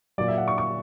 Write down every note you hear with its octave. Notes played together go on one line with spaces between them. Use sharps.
A#2 F#3 D5
E5
F#5
C#6
C#6